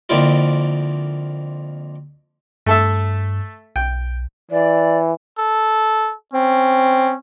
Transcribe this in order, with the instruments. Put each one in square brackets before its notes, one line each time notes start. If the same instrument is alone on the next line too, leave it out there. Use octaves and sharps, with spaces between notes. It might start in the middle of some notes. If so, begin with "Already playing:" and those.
[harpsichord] F2 D3 A#3 C4 E4 F4
[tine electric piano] G2 [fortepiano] A3 A4 E5
[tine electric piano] B1 [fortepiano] G5
[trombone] E3 [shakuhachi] D5
[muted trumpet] A4
[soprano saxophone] C4 [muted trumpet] C#4